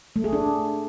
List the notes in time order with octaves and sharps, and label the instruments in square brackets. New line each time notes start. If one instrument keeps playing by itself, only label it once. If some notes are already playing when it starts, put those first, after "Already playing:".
[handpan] A3
G#4
D4